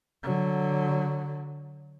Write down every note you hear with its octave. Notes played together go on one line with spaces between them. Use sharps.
D3 F#3